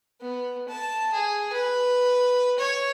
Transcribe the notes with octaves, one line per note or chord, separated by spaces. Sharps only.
B3
A5
G#4
B4
C#5